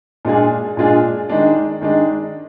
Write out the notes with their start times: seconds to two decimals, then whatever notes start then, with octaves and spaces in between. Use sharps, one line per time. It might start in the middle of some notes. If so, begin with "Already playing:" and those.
0.25 A#2 G#3 D4 F4 G#4
0.77 A#2 G#3 D4 F4 G#4
1.29 D#3 G#3 D4
1.81 D#3 G#3 D4